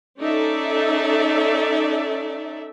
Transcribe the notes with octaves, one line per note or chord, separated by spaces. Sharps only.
C#4 D#4 A4 D5 E5